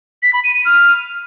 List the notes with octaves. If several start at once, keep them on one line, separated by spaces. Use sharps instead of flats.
B6
B5
D#7
D#7
F6